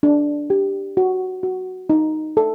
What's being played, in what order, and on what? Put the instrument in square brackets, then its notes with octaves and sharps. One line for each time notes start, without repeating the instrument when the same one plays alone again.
[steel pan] D4
G4
F#4
F#4
D#4
A4